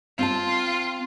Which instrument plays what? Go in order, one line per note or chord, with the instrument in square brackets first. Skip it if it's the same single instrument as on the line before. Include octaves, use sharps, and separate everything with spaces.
[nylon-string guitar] C4 F5 A5 [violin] F4